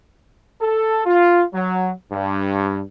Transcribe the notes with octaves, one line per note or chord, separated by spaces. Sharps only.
A4
F4
F#3
G2